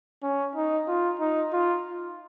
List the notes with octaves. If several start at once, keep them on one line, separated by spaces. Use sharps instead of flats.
C#4
D#4
F4
D#4
F4